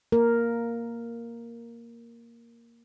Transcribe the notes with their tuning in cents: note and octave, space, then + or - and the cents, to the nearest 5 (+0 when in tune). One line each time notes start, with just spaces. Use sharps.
A#3 +0 A#4 +0